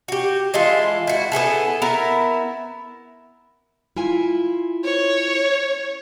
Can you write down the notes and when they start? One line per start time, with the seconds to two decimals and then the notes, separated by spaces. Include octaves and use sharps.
0.08 F#4 G4
0.54 E3 G#3 F4 A4
1.07 E4 F#4
1.32 B3 E4 G#4 A4
1.82 B3 E4 A#4 E5
3.96 E4 F4 G#5
4.84 C#5